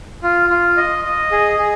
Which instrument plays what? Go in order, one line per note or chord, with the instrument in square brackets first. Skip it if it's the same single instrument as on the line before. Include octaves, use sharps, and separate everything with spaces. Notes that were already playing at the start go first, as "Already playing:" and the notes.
[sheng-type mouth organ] F4
F4
D#5
D#5
G#4
G#4